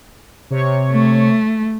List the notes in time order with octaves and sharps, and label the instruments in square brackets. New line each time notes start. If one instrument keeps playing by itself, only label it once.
[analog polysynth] C3 C#5 C#6
[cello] A3